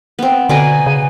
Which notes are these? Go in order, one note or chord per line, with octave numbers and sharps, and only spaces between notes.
B3 C4
B2 D3 D5 G#5 A#5
C#3